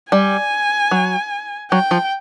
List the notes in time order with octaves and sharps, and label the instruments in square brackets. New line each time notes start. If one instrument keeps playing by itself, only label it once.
[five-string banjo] G3 [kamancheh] G#5
[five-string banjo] F#3
[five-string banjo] F#3 [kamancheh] G5
[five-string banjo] F3